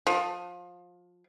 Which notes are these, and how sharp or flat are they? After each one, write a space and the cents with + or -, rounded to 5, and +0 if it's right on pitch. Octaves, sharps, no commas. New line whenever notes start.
F3 +25